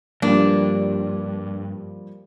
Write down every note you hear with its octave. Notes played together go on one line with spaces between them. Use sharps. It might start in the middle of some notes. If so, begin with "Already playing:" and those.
G2 F3 G3 A#3 D4